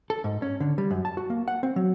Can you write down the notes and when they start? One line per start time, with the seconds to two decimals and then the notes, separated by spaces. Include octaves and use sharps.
0.10 A4
0.24 G#2
0.42 C#4
0.60 D3
0.78 G3
0.91 F#2
1.05 A5
1.17 F#4
1.30 A#3
1.48 F#5
1.63 C4
1.76 F#3